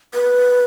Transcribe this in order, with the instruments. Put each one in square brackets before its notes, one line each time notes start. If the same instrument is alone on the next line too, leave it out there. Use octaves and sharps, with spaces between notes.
[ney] B4